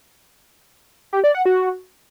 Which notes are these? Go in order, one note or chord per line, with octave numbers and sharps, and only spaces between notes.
G4
D5
F#5
F#4